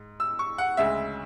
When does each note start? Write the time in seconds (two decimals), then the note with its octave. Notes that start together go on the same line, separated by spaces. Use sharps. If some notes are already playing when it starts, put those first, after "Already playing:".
Already playing: G#2
0.20 E6
0.39 C#6
0.58 F#5
0.77 D2 C#3 G#3 E5